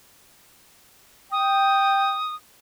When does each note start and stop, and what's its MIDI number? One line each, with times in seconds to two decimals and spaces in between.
1.32 2.18 79
1.32 2.35 87